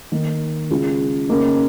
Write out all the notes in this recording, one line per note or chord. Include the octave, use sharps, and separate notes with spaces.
D#3 A#3 D#4
C#3 G#3 F4
C#3 A#3 D#4